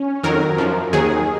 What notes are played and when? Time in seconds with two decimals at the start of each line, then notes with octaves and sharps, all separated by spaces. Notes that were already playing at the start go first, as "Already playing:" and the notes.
Already playing: C#4
0.23 F2 D#3 F#3 A#4
0.58 F#2 F3
0.93 D#2 D#3 F#3 G#4